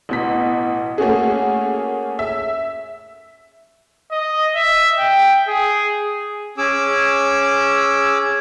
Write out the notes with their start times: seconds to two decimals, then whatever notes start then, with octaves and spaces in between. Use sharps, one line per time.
0.09 A1 B2 B6
0.98 A3 A#3 C#4 F#4 G#4
2.19 E5
4.11 D#5
4.55 E5
4.98 G5
5.48 G#4
6.58 C#4 G#4 D6 E6